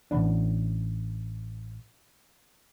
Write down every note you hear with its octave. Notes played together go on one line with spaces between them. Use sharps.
A1 F3 B3 D4